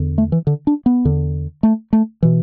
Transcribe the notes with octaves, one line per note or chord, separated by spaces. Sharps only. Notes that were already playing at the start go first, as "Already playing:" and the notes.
Already playing: E2 D3
A3
E3
D3
D4
B3
E2 D3
A3
A3
B2 E3